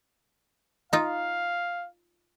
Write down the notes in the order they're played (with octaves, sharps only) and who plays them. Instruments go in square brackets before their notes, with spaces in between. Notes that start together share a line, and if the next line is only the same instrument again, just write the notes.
[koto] D#4 F4 [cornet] F5